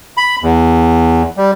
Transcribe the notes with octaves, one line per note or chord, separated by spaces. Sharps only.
B5
E2
G3